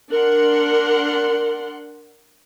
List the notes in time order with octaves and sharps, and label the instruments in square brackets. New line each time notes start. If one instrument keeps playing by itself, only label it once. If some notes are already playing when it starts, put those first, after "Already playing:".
[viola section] D4 A#4 F#5 C6